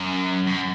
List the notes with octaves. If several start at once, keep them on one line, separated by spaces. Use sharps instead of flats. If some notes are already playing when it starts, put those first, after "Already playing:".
Already playing: F#2
F#2